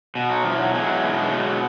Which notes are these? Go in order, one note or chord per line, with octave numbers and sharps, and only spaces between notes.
B2
F#3
E2 F3
F#3
E2 F#3 G#3
B2
F#3 G#3
B2